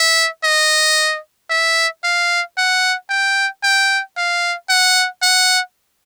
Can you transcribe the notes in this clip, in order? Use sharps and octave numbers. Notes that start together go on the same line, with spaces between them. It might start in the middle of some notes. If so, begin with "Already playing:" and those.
Already playing: E5
D#5
E5
F5
F#5
G5
G5
F5
F#5
F#5